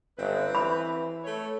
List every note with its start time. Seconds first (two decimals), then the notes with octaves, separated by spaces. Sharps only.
0.17 G1 C4 B4
0.55 E3 B5
1.24 A3 C#5